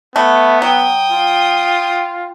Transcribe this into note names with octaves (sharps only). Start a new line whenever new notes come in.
A3 B3 B5
F#3 G5 D#6
F4